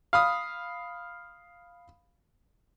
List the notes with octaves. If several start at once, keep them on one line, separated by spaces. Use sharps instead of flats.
F5 B5 D#6